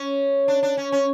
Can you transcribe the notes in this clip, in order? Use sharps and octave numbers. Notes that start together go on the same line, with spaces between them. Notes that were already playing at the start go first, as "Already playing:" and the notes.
Already playing: C#4
D4
D4
C#4
C#4